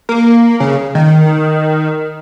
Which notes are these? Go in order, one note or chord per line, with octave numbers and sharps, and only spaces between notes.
A#3
C#3
D#3